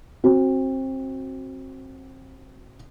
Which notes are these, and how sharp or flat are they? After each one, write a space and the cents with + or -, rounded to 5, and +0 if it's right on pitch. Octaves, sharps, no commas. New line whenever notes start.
C4 +25 F#4 +0